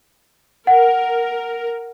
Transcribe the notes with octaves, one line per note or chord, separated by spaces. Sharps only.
A#4 F#5